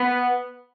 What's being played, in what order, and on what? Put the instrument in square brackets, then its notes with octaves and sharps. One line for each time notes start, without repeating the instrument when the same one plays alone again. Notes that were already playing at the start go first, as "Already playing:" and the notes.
Already playing: [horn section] B3